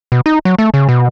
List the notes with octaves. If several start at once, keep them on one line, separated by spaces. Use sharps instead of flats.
B2
D#4
F#3
A3
C#3
B2